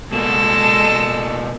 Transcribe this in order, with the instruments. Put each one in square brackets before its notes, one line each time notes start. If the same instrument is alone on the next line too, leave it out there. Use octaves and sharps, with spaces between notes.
[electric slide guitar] B2 A#3 [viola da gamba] G#3 A4 [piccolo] E7